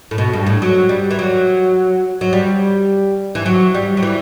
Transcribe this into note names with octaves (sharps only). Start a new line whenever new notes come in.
A2
B2
G2
A2
F#3
G3
E3
F#3
F#3
G3
E3
F#3
G3
F#3
E3